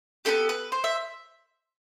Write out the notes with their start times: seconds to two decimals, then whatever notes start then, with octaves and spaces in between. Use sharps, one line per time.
0.25 B3 D4 G4 A4
0.49 B4
0.72 C5
0.84 E5